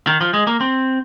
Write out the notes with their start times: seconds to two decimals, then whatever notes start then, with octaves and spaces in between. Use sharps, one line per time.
0.07 D#3
0.21 F3
0.34 G#3
0.47 A#3
0.61 C4